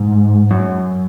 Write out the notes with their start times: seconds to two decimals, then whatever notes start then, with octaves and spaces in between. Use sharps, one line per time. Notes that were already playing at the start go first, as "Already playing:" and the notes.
Already playing: G#2
0.51 F#2